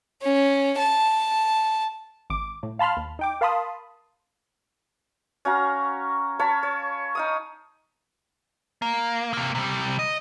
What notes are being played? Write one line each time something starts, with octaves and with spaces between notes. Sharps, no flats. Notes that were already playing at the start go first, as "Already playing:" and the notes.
C#4
A5
G#1 D6
A2
F5 A5 B5 C6 F6
D#2
D#4 G5 D6
A#4 F5 A5 B5 C6 D#6
C#4 F#4 F5 A#5
C#5 F5 A5 B5
C#5
D#4 F5 D#6
A#3
C3 A#3
C3 G3
D#5